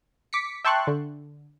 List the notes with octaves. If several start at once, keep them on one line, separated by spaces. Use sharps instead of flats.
D6 B6 C#7
E5 G5 A5 C6 C#6 F#6
D3